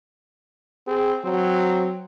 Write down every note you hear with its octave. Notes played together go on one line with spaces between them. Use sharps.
C4 G#4
F#3 C4